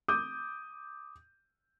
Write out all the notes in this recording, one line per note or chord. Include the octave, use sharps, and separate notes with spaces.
D6 D#6 G6